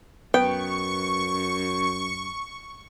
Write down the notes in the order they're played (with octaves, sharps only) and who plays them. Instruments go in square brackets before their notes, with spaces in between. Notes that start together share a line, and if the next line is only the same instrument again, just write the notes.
[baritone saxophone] F#2 [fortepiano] B3 [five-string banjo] G5 [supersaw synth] C#6